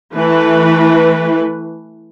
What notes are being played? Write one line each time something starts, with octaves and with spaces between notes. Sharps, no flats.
E3 A3 B4